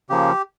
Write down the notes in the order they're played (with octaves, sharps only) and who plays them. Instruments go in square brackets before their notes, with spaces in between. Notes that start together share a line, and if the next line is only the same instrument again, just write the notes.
[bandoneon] C#3 F3 A#3 G4